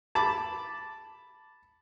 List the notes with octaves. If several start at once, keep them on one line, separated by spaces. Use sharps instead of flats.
A5 B5 D6